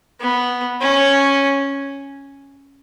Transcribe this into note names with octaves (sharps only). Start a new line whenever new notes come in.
B3
C#4